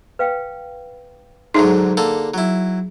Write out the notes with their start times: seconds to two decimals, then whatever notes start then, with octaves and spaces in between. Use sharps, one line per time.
0.19 B4 F5 G5
1.55 G#2 D3 F#3 D#4 G#4 E5 C#6
1.97 D3 A#3 A4
2.34 F#3 E4